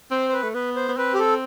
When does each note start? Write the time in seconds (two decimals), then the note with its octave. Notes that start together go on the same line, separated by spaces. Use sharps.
0.11 C4 C5
0.29 C5
0.33 B4
0.43 A3
0.54 B3 B4
0.76 C5
0.89 B3
0.97 C4 B4
1.14 G4
1.19 A4